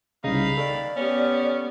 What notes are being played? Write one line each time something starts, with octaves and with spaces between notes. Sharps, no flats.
C2 C#3 D#4 F5 B5
D#3 A4 D5
B3 C#4 G4